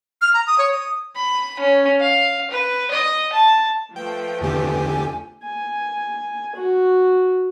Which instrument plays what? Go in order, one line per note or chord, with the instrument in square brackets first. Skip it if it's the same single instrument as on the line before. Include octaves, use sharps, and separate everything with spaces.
[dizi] F6
A#5
D#6
C#5
D#6
[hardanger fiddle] B5
C#4
F5
B4
D#5
A5
[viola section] F3 A3 [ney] B4 [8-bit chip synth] G5
[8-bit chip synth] E2 D3 G4 [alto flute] G#5
[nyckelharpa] G#5
F#4